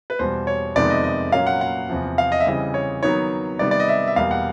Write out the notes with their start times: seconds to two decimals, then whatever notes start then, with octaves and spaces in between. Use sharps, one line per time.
0.10 B4
0.19 E2 B2 G3 C5
0.47 C#5
0.76 F2 C3 D#3 G#3 B3 D5
0.90 D#5
1.04 D#5
1.32 A#2 F#3 A#3 C#4 F5
1.47 F#5
1.61 F#5
1.90 E2 C3 F3
2.18 F5
2.32 D#5
2.40 E5
2.46 C#3 E3 G3 C4 D#5
2.74 C#5
3.03 D#3 F#3 B3 D#4 C#5
3.59 C3 D#3 G3 B3 D5
3.71 D5
3.80 D#5
3.88 E5
4.07 E5
4.16 E2 B2 G3 A#3 F5
4.31 F#5